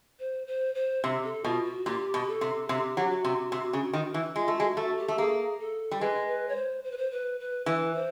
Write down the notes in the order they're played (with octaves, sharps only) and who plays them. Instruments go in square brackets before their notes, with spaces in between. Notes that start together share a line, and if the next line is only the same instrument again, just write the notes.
[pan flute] C5
C5
C5
[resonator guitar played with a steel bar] C3
[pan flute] A4
[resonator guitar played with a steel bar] B2 [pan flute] F4
[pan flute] F#4
[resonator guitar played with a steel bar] A#2 [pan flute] G4
[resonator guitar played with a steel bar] B2
[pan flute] A4
[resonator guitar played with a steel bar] C3
[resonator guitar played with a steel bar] C3 [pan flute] G4
[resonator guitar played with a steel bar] F#3
[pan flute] F#4
[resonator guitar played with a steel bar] C3
C3
C#3
D#3
E3
[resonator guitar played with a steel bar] G#3 [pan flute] F4
[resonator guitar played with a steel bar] A3
[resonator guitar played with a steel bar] G#3 [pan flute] F#4
[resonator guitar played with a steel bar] A3 [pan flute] F#4
[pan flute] G4
[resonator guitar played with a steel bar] A3
[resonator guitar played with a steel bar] A#3 [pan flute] G#4
[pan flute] A4
[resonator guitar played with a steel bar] G3
[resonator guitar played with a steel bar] G#3 [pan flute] B4
[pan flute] B4
C#5
C5
C5
B4
C5
B4
B4
[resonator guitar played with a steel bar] E3 [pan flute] B4
[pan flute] C5